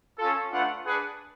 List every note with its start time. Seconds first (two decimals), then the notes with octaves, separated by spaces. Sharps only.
0.19 C#4 F4 A4
0.52 A3 D4 F4 B4 F#5
0.85 D4 G#4 B4 F#5